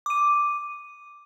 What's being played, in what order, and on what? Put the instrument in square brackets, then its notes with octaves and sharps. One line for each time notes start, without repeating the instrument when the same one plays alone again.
[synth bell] D6 D#7